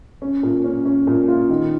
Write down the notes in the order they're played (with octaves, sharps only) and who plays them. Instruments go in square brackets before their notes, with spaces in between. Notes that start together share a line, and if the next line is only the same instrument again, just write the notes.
[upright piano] C#4
A#2
C#4
C#4
A#2
F4
D#3